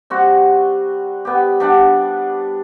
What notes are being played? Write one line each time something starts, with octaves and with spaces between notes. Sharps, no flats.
G3 C4 F#4
B3 G4
G3 D4 F#5